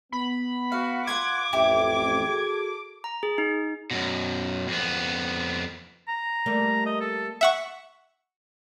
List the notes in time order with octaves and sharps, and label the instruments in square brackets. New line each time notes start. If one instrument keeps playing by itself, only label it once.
[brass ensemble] B3 [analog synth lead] B5
[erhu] F#4 [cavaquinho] F5
[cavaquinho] F4 B4 F#5 [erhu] D6 [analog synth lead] G#6
[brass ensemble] A1 F2 [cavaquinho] E4 G4
[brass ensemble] F#4 G#4 A4
[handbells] A#5
G#4
D#4
[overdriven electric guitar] F#2 B2
F2 B3
[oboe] A#5
[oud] G3 A3 A#3
[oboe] D#5
A4
[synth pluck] E5 F#5 C#6